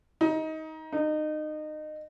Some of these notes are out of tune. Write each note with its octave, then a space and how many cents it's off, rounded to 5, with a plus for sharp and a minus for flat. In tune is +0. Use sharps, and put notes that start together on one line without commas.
D#4 +20
D#4 -25